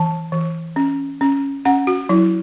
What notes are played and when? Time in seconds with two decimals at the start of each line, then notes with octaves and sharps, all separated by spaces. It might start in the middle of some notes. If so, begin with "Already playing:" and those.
Already playing: E3 A5
0.32 E3
0.76 C#4
1.21 C#4
1.65 C#4 F#5
1.87 F#4
2.09 F#3 E4